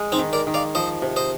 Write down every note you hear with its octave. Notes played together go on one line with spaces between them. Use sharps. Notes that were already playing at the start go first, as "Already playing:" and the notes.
Already playing: G#3
C4 D#4
D#3
A#4 D5
D#3
D5 F5
F3 C5 D#5
C3
C5 D#5